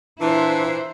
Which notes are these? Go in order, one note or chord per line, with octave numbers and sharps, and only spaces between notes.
A#2 E3 D4 E4 C5